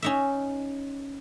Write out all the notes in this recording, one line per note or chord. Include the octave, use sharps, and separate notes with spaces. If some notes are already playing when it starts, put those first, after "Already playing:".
C#4 D#4 E5